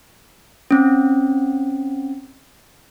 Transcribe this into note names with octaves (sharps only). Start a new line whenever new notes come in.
C4 C#4